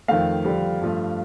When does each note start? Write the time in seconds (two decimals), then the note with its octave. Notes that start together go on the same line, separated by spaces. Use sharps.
0.08 F2 D#3 A3 F5
0.44 F2 D3 G3
0.81 G2 F3 A3